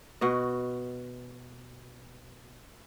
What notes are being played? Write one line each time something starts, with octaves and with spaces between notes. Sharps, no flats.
B2 F#4 D#5